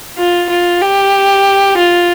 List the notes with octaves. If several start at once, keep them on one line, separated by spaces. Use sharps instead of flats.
F4
F4
G4
F4